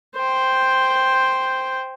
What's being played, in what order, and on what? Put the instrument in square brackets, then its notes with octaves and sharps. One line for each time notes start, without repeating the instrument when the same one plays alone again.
[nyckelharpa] C5 G5